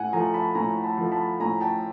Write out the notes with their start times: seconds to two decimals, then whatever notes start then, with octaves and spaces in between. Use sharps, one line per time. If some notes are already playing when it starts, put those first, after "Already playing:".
Already playing: A2 F#5 G#5
0.13 F3 A3 G#5 A#5
0.34 A5 B5
0.55 A2 G#5 A#5
0.83 A5 B5
0.97 F3 A3
1.12 A5 B5
1.40 A2 G#5 A#5
1.61 G5 A5